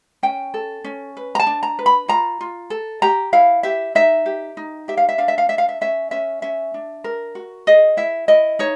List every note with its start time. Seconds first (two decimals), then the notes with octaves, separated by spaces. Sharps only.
0.23 C#4 G5
0.54 A4
0.84 C#4
1.17 B4
1.35 A#5
1.40 A5
1.47 D4
1.63 A#5
1.79 B4
1.86 B5
2.08 F4 A#5
2.41 F4
2.70 A4
3.02 G4 A#5
3.33 E4 F5
3.63 G4 E5
3.95 D#4 E5
4.26 G4
4.57 D#4
4.88 G4 E5
4.97 F5
5.09 E5
5.18 D4 F5
5.28 E5
5.38 F5
5.49 D4 E5
5.58 F5
5.69 E5
5.81 C#4 E5
6.11 C#4 E5
6.42 C#4 E5
6.74 D4
7.04 A#4
7.35 F#4
7.67 G#4 D#5
7.97 E4 E5
8.28 E4 D#5
8.59 D#4 C#5